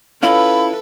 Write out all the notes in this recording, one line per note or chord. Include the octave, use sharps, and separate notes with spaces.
C#4 E4 F4 A4 B4 F5 B5